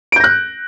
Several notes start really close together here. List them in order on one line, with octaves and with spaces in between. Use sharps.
D7 G6 A#6 F#6